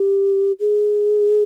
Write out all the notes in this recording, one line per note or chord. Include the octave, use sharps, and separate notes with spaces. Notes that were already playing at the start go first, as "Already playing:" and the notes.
Already playing: G4
G#4